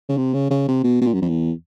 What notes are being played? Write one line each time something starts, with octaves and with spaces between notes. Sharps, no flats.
C#3
C3
C#3
C#3
C3
B2
B2
A#2
F#2
F2
E2